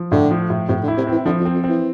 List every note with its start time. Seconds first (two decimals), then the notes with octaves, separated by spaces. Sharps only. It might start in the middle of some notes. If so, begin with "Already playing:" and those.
Already playing: F3
0.12 A2 D3
0.31 F3
0.50 A2
0.68 A2 C3
0.83 D3
0.88 E4
0.98 C3
1.07 E3 C4
1.26 D3 F3
1.40 F2
1.45 C4
1.54 F2
1.64 C4
1.69 E3